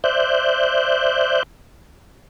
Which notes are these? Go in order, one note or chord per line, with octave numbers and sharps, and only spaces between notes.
C5 D5 E5 F#6 G6